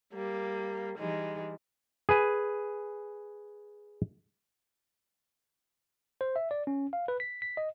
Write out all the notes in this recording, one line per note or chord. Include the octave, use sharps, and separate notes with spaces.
G3 A#3
E3 G3 G#3 D#4
G#4 B4 G#5
C5
E5
D5
C#4
F5
B4
B6
B6
D#5